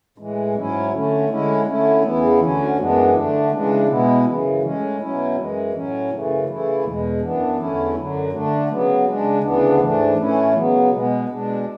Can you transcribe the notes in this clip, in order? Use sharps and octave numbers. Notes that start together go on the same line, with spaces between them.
A2 E3 G#3
G#2 F#3 C#4 E4
D3 A3 C#4
D3 G#3 C#4 E4
D3 A3 C#4 E4
E2 C#3 E3 B3 E4
D2 D3 F#3 C#4
F#2 E3 G#3 B3 D4
D3 A3 D4
C#3 E3 G#3 D4
B2 G#3 B3 E4
F#2 C#3 E3
A2 G#3 C#4
B2 F#3 C#4 E4
F#2 E3 G#3
A2 F#3 C#4
F#2 C#3 E3 A3
C#3 E3 A3 E4
E2 B2 G#3
F#2 E3 B3 D4
E2 D3 A3 C#4 E4
F#2 D3 F#3
D3 A3 D4
C#3 F#3 B3
C#3 G#3 D4
D2 C#3 E3 B3 D4
G#2 E3 A3 D4
A2 E3 A3 C#4 E4
C#3 F#3 B3
B2 G#3 B3
B2 G#3 D4